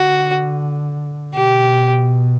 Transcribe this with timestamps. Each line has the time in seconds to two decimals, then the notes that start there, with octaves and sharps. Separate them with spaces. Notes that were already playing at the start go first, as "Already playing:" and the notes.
Already playing: D3 F#4
1.35 B2 G4